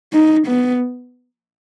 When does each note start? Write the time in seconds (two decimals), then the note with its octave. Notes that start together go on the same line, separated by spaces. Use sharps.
0.13 D#4
0.47 B3